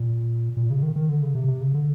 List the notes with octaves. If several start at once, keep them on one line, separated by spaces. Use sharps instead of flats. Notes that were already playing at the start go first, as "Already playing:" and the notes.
Already playing: A#2
A#2
C#3
D#3
D#3
D3
C#3
C3
C3
C#3
D3